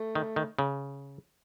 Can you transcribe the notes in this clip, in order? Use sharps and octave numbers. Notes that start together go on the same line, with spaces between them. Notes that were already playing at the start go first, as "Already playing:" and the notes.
Already playing: A3
D#3
D#3
C#3